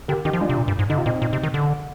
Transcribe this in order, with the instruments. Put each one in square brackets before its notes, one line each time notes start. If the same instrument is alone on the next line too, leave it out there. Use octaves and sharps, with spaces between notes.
[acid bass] D3 [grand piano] G4 A#4
[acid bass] D#3 [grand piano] D#4 G4
[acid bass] F3
[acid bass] G#3 [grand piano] D4 F4
[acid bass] C3
A#2
G2
G#2
[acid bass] D3 [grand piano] D#4
[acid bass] C3 [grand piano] F4
[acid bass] A#2 [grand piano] C4 D#4
[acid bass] A#2
C3
D#3
D3